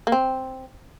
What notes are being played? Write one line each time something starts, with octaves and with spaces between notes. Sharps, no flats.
A#3
C4